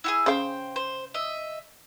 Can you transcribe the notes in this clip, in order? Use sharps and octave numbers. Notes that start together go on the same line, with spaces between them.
E4 F#4 G#4
C#3 C5 F5 G5
C5
D#5 E5